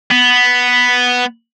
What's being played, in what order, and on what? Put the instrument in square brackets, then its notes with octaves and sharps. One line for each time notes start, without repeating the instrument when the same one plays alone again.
[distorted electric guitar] B3